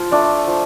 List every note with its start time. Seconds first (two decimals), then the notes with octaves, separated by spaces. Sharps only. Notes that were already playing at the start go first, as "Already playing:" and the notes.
Already playing: F3 F4
0.11 A3 D4 D5
0.48 F3